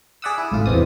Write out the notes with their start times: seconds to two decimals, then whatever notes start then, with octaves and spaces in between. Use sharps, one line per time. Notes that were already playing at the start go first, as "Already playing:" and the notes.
0.22 G#4 D5 E5 F#5 D#6 E6
0.38 E4
0.52 G#1 A2 F4
0.66 E2 B2 C4 D#6